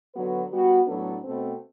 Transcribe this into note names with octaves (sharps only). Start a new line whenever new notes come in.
D3 F#3 B3 F#4 B4
G3 B3 F#4
A2 F#3 B3 D4 A4
B2 A3 C4